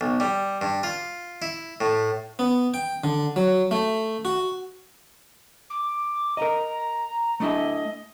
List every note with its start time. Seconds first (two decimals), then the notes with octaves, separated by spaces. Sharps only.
0.01 B1
0.20 G3
0.61 G2
0.83 F4
1.42 E4
1.81 A2
2.39 B3
2.74 G5
3.04 D3
3.36 F#3
3.71 A3
4.25 F#4
5.70 D6
6.37 A#4 D#5 A#5
7.40 A3 D4 E4 D#5